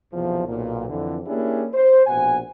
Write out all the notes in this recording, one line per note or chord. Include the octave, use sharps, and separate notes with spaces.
B1 E2 C3 F3
B1 A#2
F2 D3 E3
A#3 C#4 D4 E4 G4 G#4
C5
A#1 B2 F#5 G#5